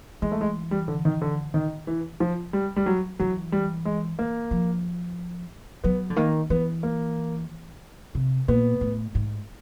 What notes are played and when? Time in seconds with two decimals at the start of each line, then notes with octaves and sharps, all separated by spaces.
0.22 E3 G#3
0.32 A3
0.41 G#3
0.71 G3
0.88 D3
1.05 D#3
1.22 D3
1.54 D#3
1.87 E3
2.20 F3
2.53 G3
2.76 G3
2.86 F#3
3.19 E3 F#3
3.52 G3
3.85 G#3
4.19 A#3
4.51 F3
5.84 F#3 B3
6.10 D3
6.16 D#3 A#3
6.50 E3 B3
6.83 A#3
8.15 C3
8.48 A#2 B3
8.81 A2
9.15 G#2